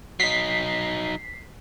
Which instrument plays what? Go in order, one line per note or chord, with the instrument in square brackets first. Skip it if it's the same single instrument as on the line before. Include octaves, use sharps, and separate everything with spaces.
[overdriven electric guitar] F#3 D#4 [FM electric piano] B6 C7